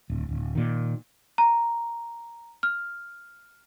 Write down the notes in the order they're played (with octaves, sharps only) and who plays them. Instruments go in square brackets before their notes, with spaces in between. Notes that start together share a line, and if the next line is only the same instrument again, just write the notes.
[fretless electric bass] D1
D1
A#2 D#3
[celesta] A#5
F6